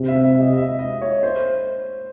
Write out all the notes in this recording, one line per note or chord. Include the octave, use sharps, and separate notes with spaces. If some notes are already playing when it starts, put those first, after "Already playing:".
Already playing: C3
E5
E5
D#5
D#5
E5
D#5
C#5
C5